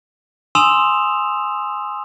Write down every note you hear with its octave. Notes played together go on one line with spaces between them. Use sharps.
G#5 C6 D#6 E6 E7 F7